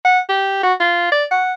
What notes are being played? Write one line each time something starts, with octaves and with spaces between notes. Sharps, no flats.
F#5
G4
F#4
F4
D5
F#5